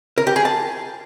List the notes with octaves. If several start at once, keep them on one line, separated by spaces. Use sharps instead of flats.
A#4
G4
G#4
A5